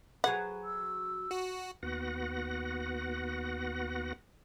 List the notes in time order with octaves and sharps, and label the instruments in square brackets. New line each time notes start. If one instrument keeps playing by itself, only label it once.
[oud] F#3 G#4 B4 [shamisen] F#5
[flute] E6
[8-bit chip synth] F#4
[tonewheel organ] D#2 B3 F#4 B4 F#5 A#6